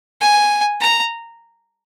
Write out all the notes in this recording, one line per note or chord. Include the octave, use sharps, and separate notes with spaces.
G#5
A#5